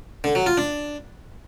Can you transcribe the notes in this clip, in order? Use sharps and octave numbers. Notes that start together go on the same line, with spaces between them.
D3
F#3
F4
D4